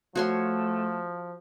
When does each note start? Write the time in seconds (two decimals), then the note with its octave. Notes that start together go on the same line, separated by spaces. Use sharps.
0.15 F3 A3 F#4 C#5 C6